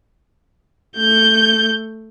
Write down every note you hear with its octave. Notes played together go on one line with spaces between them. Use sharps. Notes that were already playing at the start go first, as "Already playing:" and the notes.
A3 G6